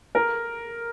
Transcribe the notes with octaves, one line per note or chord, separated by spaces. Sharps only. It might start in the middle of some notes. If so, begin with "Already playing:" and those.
A#4